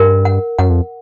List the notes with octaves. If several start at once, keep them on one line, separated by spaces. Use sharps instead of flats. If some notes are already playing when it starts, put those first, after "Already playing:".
Already playing: G2 A#4
F#5
F#2 F#5
F2